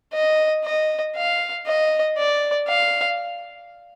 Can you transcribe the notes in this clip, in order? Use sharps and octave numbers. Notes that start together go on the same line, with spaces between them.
D#5
D#5
F5
D#5
D5
F5